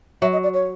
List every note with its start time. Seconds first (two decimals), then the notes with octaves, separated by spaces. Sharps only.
0.22 F#3 E5
0.33 D#5
0.43 D5
0.54 C#5